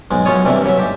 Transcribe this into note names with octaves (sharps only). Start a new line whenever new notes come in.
B1 G#2 G#3
F#2 F#3 C#4 F4 C#5 D#6
C2 G2 C3 E3 A#3 E5
C#3 F#3 E5
G#2 G4 E5